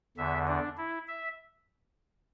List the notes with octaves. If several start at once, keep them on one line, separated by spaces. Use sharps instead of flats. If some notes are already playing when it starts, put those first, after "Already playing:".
E2 D3 E5
D4
E4
E5